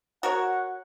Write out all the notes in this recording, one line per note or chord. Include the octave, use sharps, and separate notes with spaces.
F#4 A#4 C#5 F#5